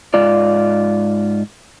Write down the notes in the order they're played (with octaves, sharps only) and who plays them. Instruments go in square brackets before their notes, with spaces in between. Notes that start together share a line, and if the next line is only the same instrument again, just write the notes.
[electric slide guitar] G#2 F4 D5